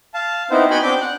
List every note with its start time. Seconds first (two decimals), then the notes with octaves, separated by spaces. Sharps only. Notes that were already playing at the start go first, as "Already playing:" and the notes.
0.14 F5 A5
0.51 B3 C4 D#4 E4 C5
0.70 B3 D#4 F#4 G5 G#5 B5
0.83 C4 D4 D6 G6
1.01 F#5